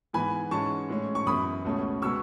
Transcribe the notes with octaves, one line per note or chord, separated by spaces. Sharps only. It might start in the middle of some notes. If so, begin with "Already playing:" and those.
G#2 E3 B3 G#5 B5
G#2 E3 G#3 C#4 A5 C#6
A2 G#3 C#4
C#6
F#2 E3 B3 B5 D#6
C#2 B2 A3 C#4
B2 G#3 B3 C#6 E6